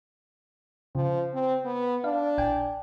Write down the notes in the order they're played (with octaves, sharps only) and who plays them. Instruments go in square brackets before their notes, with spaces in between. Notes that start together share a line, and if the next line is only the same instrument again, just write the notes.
[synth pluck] C#3 [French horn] F3
[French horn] C4
B3
[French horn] D4 [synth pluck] F5
[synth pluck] A#1 G5 G#5